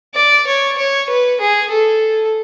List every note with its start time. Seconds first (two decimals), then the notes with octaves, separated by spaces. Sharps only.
0.15 D5
0.47 C#5
0.78 C#5
1.10 B4
1.41 G#4
1.71 A4